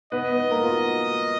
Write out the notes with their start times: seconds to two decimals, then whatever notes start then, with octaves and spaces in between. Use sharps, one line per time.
0.12 B3 B4 D#5
0.32 B3 B4
0.51 A#3 A#4
0.63 F4
0.71 F#4